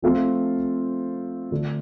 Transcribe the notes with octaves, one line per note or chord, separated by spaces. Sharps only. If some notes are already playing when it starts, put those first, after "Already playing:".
F3 A3 C4 F4
D3 A3 D4 F4